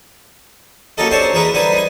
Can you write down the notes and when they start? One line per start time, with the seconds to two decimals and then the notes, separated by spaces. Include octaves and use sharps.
0.98 F#3 A#3 C#4 G4 A4 D#5
1.11 C4 D4 G4 C5 C#5 A5
1.33 E3 G#4 A#4 B4
1.54 D3 G3 B4 C5 G#5
1.73 D#4 G#5